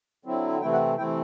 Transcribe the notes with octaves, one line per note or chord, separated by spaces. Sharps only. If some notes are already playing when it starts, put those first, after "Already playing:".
D3 F#3 C4 E4
C3 E3 A3 C4 E4 G5
F#5
C3 E3 A3 C4 E4 G5